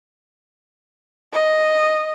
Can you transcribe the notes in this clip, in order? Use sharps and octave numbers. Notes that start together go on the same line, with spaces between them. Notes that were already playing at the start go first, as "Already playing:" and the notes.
D#5